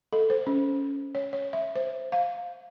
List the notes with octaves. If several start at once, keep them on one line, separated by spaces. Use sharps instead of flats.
A4
C5
C#4
C#5
C#5
E5
C5
F5